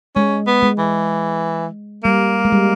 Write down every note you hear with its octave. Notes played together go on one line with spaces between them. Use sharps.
G#3 C#4
B3
G#3
E3
G3 A#3
G#3
G3